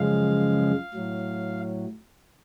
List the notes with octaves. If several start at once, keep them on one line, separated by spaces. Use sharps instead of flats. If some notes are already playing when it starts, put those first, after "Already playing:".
Already playing: F#2 C#3 F3 G#3 F5
A2 F#3